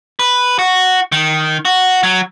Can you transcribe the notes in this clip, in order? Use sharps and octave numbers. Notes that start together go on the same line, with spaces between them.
B4
F#4
D#3
F#4
F#3